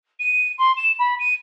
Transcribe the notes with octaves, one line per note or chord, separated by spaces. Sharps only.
D#7
C6
E7
B5
D#7